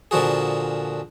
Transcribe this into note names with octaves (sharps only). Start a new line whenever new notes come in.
A#2 D3 F3 F#4 G#4